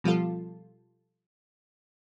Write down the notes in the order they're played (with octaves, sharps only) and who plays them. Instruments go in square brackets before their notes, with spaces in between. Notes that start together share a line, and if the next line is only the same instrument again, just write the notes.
[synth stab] B2 F3 G3 F4 A4